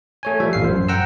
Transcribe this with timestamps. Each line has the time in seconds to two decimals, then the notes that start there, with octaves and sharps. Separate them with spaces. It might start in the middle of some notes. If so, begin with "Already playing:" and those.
0.23 A3 C#5 G#5
0.40 F3 G3 E5
0.53 A1 F5 C7
0.64 F#2 C5
0.89 F#5 G5 A#5 E6